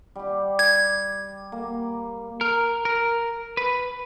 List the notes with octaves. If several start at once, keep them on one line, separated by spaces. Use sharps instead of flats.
G3 G4
G#6
A#3
A#4
A#4
B4